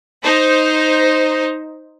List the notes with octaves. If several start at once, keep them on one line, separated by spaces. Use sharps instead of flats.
D#4 C5